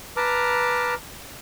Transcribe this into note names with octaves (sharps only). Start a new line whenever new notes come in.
B4 A5 A#5 D6 F6